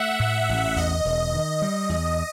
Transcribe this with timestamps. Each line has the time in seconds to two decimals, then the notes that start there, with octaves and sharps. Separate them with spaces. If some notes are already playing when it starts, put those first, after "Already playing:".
Already playing: A3 E5 F#5
0.19 A2
0.49 A1
0.76 E2 D#5
1.05 E1
1.33 D#3
1.62 G3
1.89 E2